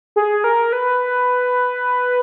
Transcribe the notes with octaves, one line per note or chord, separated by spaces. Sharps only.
G#4
A#4
B4